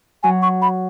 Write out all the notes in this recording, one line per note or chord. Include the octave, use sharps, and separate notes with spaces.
F#3 G#5
C#6
B5